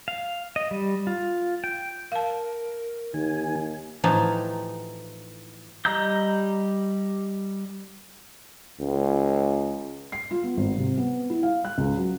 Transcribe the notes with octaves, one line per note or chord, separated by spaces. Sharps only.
F5
D#5
G3
F4
G5
A#4 F5 A5
D#2 D#3 G#5
A2 E3 F3 D#4 G4
G3 D#5 A#5 E6 G6
C#2
C7
F4
B3
G#1
C3
B3
E4
F5
F#6
C#2
F#3